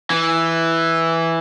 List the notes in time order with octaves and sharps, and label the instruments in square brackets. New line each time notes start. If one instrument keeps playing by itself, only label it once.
[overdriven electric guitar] E3